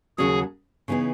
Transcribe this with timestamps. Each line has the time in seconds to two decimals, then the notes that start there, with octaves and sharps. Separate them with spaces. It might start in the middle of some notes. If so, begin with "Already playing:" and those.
0.18 D#2 C#3 F#3 C#4 F#4 G#4
0.88 C#3 E3 B3 D#4 G#4